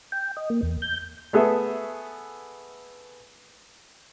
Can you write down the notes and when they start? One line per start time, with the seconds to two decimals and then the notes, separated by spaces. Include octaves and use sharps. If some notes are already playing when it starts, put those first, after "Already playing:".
0.12 G5
0.37 D#5
0.50 A#3
0.63 E2
0.82 G6
1.33 A3 B3 G#4 A4 E5